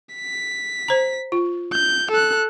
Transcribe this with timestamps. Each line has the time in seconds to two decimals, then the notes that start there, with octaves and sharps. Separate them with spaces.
0.15 B6
0.88 C5 A#5
1.32 F4
1.73 G6
2.11 A4 F#6